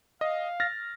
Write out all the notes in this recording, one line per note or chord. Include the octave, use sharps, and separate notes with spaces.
D#5 F5
F6 A6 A#6